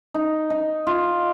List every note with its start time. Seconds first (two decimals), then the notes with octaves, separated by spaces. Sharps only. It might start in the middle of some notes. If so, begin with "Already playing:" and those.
0.14 D#4
0.50 D#4
0.87 F4